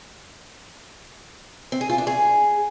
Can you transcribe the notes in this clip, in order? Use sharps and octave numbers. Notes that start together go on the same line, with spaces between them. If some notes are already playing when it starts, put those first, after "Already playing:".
C4
G#4
F4
D4
G#4